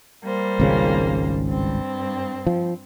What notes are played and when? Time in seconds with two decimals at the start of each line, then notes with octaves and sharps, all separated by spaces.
0.24 G3 A#3 C5
0.60 G#1 C#2 C#3
1.46 G2 C4
2.47 F3